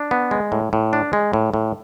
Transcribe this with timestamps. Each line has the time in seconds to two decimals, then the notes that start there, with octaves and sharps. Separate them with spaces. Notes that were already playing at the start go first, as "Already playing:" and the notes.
Already playing: D4
0.11 B3
0.31 G#3
0.52 A2
0.73 A2
0.93 D4
1.13 G#3
1.33 A2
1.54 A2